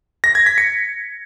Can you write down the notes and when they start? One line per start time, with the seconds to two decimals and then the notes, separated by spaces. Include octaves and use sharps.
0.24 A#6
0.35 G#6
0.46 B6
0.58 C#7